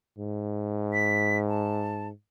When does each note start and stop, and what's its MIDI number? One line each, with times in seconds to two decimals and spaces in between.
0.18 2.10 44
0.93 1.37 95
1.48 2.07 81